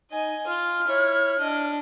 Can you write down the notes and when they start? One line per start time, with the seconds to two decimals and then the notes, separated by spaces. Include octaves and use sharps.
0.11 D#4 D#5 G#5
0.47 F4 F6
0.87 E4 C#5
1.40 D4 D#5